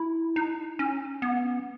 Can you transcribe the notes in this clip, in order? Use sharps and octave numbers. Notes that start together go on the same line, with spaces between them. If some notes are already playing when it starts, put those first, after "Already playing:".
Already playing: E4
D#4
C#4
B3